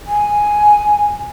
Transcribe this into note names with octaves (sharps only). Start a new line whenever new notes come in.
G#5